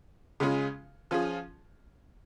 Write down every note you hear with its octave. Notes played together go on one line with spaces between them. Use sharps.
C#3 G#3 C#4 F4 G#4
F3 C#4 F4 G#4